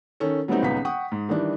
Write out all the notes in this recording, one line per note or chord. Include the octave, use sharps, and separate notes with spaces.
D#3 C#4 A4
F#3 G3 A3 B3 C4 D#4
D#1 C#2 B3 D#4 B6
F#5 G5 C#6 D#6
G#2
D#3 E3 G3 D4